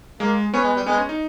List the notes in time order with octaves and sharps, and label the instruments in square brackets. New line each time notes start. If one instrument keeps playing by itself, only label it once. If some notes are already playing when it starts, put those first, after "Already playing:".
[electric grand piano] G#3 [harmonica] A#3
[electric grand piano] B3 [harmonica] C#4
[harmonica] G#3
G3
[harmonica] G#3 [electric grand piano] B3
[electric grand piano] C#4
D#4